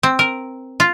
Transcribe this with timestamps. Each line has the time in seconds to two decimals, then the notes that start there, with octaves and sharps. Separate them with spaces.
0.03 C4
0.19 A#4
0.80 F4